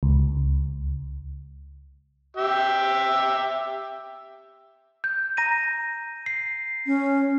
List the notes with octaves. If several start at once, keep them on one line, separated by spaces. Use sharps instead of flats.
C#2
G4 E5
G6
A#5 A#6 D#7
C7
C#4